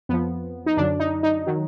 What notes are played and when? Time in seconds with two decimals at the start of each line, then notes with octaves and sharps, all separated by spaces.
0.09 F2 F3 B3
0.66 D#4
0.77 F#2 D3 F#3 D4
1.00 D#4
1.23 D#4
1.47 D#3 F#3